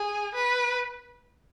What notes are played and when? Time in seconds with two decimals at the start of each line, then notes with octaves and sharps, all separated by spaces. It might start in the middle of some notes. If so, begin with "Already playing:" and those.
Already playing: G#4
0.35 B4